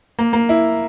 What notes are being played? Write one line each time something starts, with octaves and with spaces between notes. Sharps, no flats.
A#3
A#3
E4